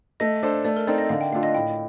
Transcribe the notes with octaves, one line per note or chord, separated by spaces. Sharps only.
A3 D#5
D4 A4 C5
A3 D5
A#4
C4 D#4 A4 C5 D5
D#5
D3 F5
G5
A3 D4 F4 F5
D#5
A2 G5